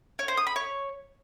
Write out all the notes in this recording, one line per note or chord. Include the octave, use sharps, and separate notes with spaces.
C#5
C5
D#6
B5
C#5